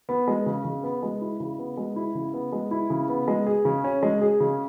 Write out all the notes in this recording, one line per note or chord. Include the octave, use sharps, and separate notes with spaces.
B3
G#3
C#3
C#3
B3
G#3
E4
C#3
B3
G#3
E4
C#3
B3
G#3
E4
C#3
B3
G#3
G#4
C#3
C#4
G#3
G#4
C#3